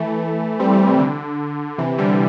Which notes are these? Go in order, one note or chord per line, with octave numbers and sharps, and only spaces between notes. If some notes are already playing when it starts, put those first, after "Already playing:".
Already playing: E3 A3
G3 C4
E3 A3
C3
D3
C3 E3
D3 G3